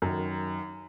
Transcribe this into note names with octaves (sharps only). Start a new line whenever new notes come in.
F#2 D#3